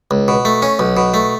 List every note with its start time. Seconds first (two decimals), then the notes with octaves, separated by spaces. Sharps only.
0.11 C#2
0.28 B2
0.45 A3
0.62 C#4
0.79 B1
0.97 B2
1.14 A3